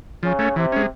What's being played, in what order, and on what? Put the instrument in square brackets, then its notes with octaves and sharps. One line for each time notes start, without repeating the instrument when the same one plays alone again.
[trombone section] C#3 [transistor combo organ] F3
[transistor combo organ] A3 C#4
[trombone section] C3 [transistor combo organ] E3
[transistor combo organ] G#3 C#4